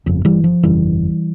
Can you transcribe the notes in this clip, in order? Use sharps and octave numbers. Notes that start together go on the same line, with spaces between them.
G1 F2 C#3
E3 G3
F3
G1 F2 C#3 E3 G3